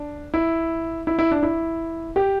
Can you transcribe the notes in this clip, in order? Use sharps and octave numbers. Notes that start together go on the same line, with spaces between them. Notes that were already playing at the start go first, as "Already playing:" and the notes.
Already playing: D4
E4
E4
E4
D4
E4
G4